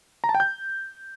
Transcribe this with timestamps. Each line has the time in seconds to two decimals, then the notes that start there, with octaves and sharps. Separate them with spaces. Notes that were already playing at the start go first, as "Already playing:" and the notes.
0.24 A#5
0.29 A5
0.35 G5
0.40 G6